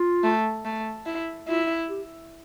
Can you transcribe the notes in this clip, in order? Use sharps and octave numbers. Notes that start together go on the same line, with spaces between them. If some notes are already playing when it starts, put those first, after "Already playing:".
Already playing: F4
A3
A3
E4
E4 F4
G4